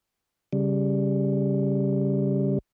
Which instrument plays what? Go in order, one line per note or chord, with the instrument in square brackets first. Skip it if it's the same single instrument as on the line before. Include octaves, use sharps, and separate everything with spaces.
[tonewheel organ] C#3 G3